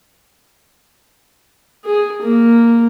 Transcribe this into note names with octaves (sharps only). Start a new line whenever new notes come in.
G#4
A#3